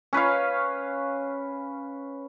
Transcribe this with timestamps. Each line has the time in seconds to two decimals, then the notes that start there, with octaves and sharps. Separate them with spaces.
0.13 C#4 B4 C#5 F5